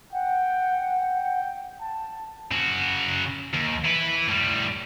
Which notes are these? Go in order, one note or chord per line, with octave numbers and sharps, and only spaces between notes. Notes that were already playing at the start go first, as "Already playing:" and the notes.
F#5 G5
G5
A5
C#3 F#4
D#2
E4 B4
A2 G3